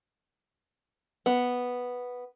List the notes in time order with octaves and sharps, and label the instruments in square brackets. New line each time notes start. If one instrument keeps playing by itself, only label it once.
[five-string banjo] B3